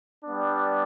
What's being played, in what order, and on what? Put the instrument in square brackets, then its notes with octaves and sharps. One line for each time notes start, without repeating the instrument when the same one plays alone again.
[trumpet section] G3 B3 D4